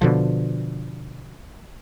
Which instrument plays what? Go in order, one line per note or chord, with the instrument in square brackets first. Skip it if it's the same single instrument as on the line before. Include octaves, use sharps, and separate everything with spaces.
[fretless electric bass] B2 D3 F3